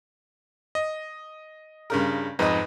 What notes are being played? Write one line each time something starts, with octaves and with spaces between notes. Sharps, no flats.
D#5
G2 C#3 A#4
F2 G#2 D#4 B4 D#5